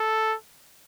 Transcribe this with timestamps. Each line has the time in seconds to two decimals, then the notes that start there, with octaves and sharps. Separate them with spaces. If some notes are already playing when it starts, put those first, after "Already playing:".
Already playing: A4